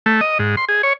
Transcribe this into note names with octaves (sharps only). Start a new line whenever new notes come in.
A3
D#5
G#2
C6
G#4
C#5